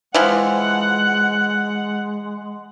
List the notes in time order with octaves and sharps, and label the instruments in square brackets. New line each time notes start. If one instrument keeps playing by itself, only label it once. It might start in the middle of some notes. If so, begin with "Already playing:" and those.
[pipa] E3 F3 [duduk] G#3 [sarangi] F#5